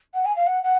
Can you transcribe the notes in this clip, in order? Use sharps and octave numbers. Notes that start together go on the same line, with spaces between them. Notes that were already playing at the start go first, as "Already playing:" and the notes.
F#5
G#5
F5
F#5
F#5